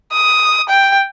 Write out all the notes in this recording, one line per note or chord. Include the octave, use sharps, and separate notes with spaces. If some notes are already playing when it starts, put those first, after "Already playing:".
D#6
G5